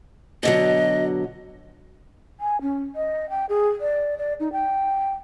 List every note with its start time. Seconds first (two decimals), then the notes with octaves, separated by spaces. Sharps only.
0.43 B2 D3 F#3 D#5
2.40 G#5
2.61 C#4
2.96 D#5
3.30 G5
3.49 G#4
3.81 D5
4.18 D5
4.40 D#4
4.52 G5